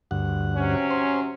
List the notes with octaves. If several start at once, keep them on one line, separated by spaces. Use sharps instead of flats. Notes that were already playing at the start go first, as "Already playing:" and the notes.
D2 G2 F#5
C3 F#3 C#4
C5 C6